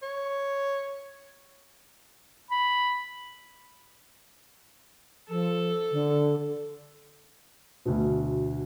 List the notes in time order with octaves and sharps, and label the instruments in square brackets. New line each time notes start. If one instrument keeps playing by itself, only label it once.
[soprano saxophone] C#5
[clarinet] B5
[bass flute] F3 [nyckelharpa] A4
[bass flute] D3
[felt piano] D2 B2